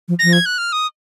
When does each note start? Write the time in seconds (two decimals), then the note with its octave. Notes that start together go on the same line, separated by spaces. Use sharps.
0.08 F3
0.19 F3 A#6
0.33 G#6
0.46 F#6
0.58 F6
0.72 D#6